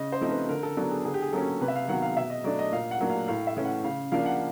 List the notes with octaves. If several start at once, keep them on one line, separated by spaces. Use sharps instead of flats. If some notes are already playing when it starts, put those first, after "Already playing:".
Already playing: C#3 D#5
C5
F3 A3 C4 D#4
B4
D3 A#4
A4
F#3 B3 D4 A4
G#4
D3 G#4
G4
G#4
F#3 A#3 C#4 A4
C3 B4
E5
F5
D#3 F#3 B3 F#5
F5
B2 E5
D#5
F#3 A3 D4 D5
D#5
A#2 F5
F#5
F#3 A#3 D4
F5
A2 F5
E5
E3 A3 C#4
F#5
C#3 F5
F3 A#3 D4 F5
F#5